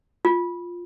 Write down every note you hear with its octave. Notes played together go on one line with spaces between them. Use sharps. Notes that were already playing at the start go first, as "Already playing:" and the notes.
F4